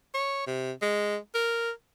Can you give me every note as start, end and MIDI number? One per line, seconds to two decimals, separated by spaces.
0.14 0.42 73
0.47 0.72 48
0.82 1.17 56
1.35 1.70 70